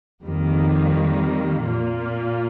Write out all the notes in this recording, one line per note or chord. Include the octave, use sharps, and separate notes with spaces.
F2 D#3 G3 A#3
A#2 A#3 F4